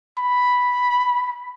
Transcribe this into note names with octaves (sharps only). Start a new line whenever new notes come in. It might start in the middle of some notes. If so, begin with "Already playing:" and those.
B5